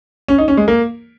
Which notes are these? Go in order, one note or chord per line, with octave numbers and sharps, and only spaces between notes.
C#4
D#4
C#4
G#3
A#3